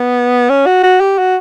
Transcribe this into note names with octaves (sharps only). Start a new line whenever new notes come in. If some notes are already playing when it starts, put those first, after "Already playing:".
Already playing: B3
C#4
F#4
F#4
G4
F#4